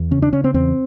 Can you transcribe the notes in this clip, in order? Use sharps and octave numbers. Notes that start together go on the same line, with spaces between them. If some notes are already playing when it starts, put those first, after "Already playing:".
Already playing: E2
C#3 C#4
D4
C#3 C#4
C4
E2 C4